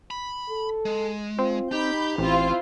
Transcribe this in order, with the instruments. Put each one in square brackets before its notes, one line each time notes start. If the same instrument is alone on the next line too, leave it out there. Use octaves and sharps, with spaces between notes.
[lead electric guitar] B5
[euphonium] A4
[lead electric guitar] G#3
[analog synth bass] C4 [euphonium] F4
[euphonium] D#4 [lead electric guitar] G4 [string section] B5 G6
[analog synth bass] A1 [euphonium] C4 [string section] E4 F4 C5